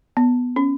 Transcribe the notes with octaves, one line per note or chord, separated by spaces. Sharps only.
B3
C#4